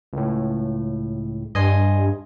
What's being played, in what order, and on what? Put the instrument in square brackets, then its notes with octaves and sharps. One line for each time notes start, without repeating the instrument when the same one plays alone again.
[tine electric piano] C#2 A2
[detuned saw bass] G2 [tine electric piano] D#5 G#5 C6